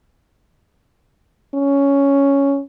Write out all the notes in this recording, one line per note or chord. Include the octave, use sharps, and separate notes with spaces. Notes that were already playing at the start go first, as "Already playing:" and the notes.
C#4